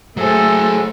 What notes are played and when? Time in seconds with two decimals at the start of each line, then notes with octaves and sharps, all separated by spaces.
0.17 F#3 A3 G#4 A4 C5